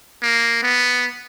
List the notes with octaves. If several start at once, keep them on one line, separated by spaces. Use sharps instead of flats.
A#3
B3